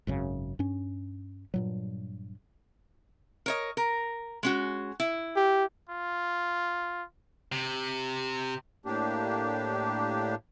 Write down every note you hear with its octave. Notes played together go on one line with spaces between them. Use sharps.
G#1 F#2 C#3
G2 C#4
G2 A#2 F#3
A#4 C#5 D#5
A#4
G#3 C#4 F#4
E4
G4
F4
C3
A2 A#3 D4 G4